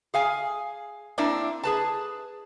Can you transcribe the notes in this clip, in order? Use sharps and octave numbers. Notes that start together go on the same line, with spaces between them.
G#4 F5 G#5
A#3 C4 D4 E4 A#4
G#4 B4 A5